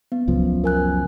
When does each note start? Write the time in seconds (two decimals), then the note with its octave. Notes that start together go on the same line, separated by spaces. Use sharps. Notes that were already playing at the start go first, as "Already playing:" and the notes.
0.12 B3
0.28 C#2 F#2 F3
0.64 A#4 G#5 F#6